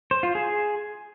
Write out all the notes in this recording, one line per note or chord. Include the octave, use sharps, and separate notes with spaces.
C5
F4
G#4